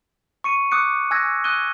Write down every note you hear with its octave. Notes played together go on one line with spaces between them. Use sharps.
C#6 C#7 D#7
D6 D#6 F#6 C#7
G#5 E6 F#6 G#6 A#6
D#6 F#6 G#6 D#7 G7